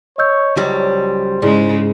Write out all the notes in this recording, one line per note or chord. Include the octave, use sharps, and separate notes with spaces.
C#5 D#5 E6 G6
C#2 F#3 G3 C5
G#2 C#3 G#3 E4 G#4 D5